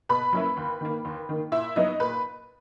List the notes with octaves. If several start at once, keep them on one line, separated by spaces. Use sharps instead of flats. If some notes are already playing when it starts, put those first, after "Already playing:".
B2 B4 B5
F#3 A#3 C#4 E4
D#2
D#3 A#3
D#2
D#3 A#3
A#2 E4 E5
F#3 B3 D#4 E4 D#5
A#2 B4